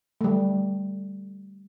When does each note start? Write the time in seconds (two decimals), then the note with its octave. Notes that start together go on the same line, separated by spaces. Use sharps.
0.21 G3 A3